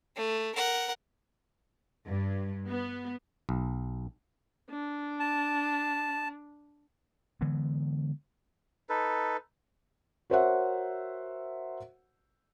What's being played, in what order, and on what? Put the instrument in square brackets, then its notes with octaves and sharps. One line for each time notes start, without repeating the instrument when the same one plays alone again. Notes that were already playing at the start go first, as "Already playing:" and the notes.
[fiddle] A3
A#4 F#5
[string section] G2
B3
[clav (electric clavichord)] B1
[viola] D4
[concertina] A5
[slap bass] D3 E3 G#3 B3
[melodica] D#4 A4 B4
[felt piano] F#4 A#4 C5 C#5 E5 F#5